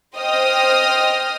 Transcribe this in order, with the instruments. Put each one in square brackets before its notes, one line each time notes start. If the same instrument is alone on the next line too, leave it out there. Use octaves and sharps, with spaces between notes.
[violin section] C5 D#5 G5 D#6 F6